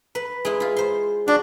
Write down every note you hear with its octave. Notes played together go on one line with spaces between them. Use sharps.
B4
G#3 E4
E4 F4
C5 C6
D4 F#4